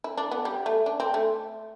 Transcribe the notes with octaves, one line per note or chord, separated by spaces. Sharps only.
E4
D4
B3
G3
A3
D4
C4
A3